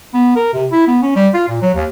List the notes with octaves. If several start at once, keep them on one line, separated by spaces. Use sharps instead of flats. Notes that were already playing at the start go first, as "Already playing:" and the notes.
B3
A#4
C3
E4
B3
C#4
G3
F4
A#2
F#3
D#2